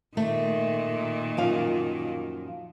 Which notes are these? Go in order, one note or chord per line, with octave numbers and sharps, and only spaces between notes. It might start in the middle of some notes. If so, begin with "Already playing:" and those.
A#2 D#3 A3
F#2 F3 F5